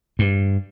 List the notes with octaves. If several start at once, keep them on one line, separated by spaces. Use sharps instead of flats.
G2